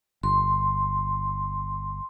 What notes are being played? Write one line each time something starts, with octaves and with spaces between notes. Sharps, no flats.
G1 C6